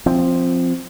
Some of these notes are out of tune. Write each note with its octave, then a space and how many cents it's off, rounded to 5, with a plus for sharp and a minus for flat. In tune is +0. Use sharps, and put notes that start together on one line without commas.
F3 +0 C4 +0